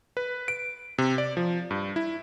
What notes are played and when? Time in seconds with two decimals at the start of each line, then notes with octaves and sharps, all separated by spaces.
0.17 B4
0.48 D7
0.98 C3
1.18 D5
1.37 F3
1.71 G2
1.96 E4